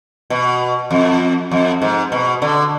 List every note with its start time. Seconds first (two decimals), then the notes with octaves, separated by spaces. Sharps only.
0.30 B2
0.91 F2
1.51 F2
1.82 G#2
2.12 B2
2.42 D3